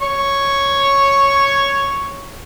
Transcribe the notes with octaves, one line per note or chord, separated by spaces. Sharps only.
C#5 C#6